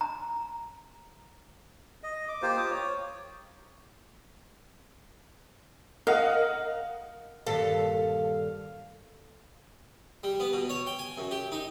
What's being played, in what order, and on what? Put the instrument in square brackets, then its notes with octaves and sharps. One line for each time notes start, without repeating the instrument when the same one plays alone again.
[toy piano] A#5
[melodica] D#5
D6
A#3 F4 G4 C5
D6 D#6
C#5
[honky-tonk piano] A#4 D#5 F#5 [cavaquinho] F5
[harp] D#1 G2 B6 [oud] A4 [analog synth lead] F5
[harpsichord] G3
B3
B2
C#5
G5
G#5
F#2
G4
D#4